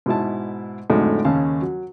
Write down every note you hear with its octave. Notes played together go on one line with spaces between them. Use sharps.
G#2 B2 E4 A5
F2 A2 D3 F#3 G#3 D#4
D#2 C#3 C#4 F5 A5
F#3